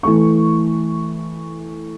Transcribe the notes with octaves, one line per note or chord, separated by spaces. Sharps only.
E3 A3 C#6